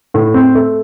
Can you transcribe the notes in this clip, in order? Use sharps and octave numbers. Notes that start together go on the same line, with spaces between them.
A2
C4
A3